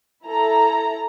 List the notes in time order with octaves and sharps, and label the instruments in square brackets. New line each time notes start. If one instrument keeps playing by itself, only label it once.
[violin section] E4 A4 A#5